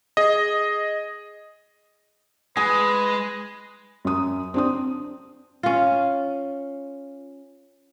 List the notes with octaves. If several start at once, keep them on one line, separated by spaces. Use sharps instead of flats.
G#4 D#5
G#3 G#4 B4
F#2 D#6
C4 D4 D#6
C#4 F4